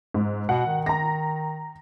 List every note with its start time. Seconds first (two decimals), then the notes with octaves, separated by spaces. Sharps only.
0.14 G#2
0.49 B2 F#5
0.67 D#3
0.86 A#5 A#6